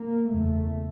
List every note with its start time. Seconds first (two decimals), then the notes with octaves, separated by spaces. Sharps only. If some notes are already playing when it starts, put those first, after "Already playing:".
Already playing: A#3
0.31 F#1 E2 C#3 A3